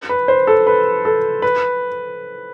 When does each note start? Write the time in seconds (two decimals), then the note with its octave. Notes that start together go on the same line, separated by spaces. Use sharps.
0.09 B4
0.28 C5
0.47 A4
0.67 B4
1.05 A4
1.42 B4